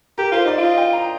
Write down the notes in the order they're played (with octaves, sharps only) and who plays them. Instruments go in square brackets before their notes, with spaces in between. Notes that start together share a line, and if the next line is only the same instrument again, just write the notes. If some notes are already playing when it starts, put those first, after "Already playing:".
[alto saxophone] G4 [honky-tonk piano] A#4
[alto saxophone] F4 [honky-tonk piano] C5
[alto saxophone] D#4 [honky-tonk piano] D5
[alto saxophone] F4
[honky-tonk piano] D#5
G5
A#5